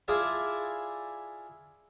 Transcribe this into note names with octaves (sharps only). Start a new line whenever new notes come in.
E4 F4 G#4 D5 G#5 A5